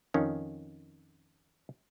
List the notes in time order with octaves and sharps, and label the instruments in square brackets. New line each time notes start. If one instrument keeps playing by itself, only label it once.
[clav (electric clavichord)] F2 D#3 C#4